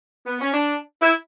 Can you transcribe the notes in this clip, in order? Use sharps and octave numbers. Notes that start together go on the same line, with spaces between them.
B3
C#4
D4
E4